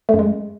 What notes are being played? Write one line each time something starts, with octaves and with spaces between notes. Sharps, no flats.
A3
F#2
G#3